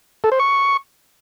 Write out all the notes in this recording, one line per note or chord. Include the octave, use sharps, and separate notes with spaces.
A4
C5
C#6